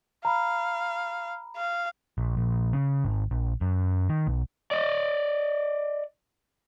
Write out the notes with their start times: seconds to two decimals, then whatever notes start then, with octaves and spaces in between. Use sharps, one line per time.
0.25 F5 A#5 B5
1.57 F5
2.18 A#1
2.37 A#1
2.73 C#3
3.05 G#1
3.31 A#1
3.61 F#2
4.09 D#3
4.27 B1
4.71 D5 D#5